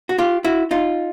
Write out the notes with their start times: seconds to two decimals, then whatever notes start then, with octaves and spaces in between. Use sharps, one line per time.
0.09 F#4
0.18 F4 G4
0.44 E4 F#4
0.71 D#4 F4